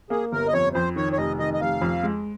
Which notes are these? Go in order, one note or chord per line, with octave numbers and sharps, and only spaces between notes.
A#3 G#4
G1 A#4
D#5
F2 C#5
F2 C5
D#3 C#5
C#5
F1 D#5
D#3 D#5
D#5
F1 F5
F2
G#3